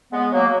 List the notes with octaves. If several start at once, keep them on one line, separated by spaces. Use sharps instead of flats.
G#3 B3
F#3 A#3